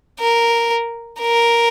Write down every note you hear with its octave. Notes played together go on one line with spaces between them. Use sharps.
A#4
A#4